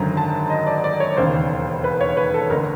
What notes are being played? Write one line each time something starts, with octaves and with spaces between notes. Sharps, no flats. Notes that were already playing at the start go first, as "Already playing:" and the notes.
Already playing: G#1 F#2 D3 A#5
A5
D#5
D5
D5
C#5
E1 D#2 C#3 C5
B4
C#5
B4
A4
A1 D3 A#4